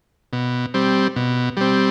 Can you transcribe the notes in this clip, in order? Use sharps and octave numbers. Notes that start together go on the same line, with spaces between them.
B2
G3 C4
B2
G3 C4